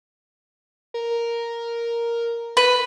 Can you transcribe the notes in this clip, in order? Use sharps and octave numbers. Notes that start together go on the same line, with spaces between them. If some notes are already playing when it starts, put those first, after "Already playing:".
A#4
B4